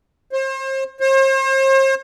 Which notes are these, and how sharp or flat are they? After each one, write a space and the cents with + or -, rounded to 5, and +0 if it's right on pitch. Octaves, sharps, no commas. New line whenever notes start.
C5 +35
C5 +40